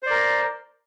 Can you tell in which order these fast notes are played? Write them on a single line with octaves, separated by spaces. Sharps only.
C5 D5 A#4